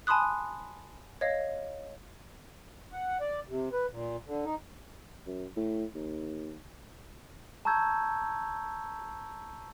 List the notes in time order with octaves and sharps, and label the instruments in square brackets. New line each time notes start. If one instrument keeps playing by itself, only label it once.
[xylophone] G#5 A5 B5 C6 D#6 F#6
C#5 D#5 F5
[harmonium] F#5
D5
C3
B4
A#2
D3
D#4
[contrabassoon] F#2
A2
D#2
[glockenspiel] A5 A#5 C#6 E6 G6 G#6